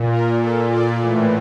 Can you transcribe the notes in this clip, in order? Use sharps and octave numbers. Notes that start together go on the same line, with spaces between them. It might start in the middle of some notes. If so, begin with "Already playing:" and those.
Already playing: A#2
A#4
A#2 A4
D5
A2 E3